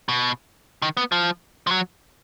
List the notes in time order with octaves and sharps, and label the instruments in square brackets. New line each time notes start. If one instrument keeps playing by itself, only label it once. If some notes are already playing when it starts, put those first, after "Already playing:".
[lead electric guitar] B2
D#3
B3
F3
F3
F#3